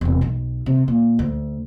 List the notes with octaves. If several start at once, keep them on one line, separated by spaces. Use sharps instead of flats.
E1 C3
B1
C3
A#2
D2